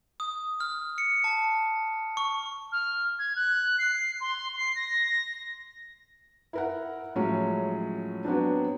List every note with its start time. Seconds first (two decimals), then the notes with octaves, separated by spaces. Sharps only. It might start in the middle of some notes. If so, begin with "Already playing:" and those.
0.20 D#6
0.60 F6
0.98 C#7
1.24 A5
2.17 C#6
2.72 F6
3.19 G#6
3.36 F#6
3.79 C7
4.20 C6
4.57 C7
4.75 A#6
6.53 E4 A#4 F#5
7.15 A2 F3 F#3 G#3 C#4
8.25 F#3 B3 C4 D4